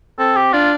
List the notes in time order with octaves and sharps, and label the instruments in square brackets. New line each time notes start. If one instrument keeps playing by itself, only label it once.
[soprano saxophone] C4 [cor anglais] A4
[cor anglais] G4
[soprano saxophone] D4 [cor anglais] F4